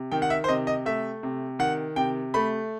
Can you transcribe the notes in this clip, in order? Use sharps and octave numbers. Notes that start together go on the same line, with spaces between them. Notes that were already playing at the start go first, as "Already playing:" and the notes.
Already playing: C3
D#3 G5
F#5
E5
C5
C3 D#5
D#5
A3 E5
C3
D#3 F#5
C3 G5
A3 B5